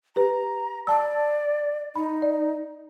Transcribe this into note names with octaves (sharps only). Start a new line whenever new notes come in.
G4 B4 A#5
D5 A5 E6
D#4 B5
D5